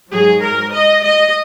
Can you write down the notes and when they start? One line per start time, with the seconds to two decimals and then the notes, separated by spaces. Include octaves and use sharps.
0.12 G#2 F#3 G#4
0.43 A#4
0.73 D#5
1.04 D#5